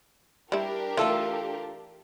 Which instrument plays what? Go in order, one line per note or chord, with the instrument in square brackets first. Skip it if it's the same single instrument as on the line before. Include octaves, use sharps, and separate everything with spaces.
[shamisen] G3 E4 [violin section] D4 G4 A#4
[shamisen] E3 A3 [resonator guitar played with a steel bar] F4 A4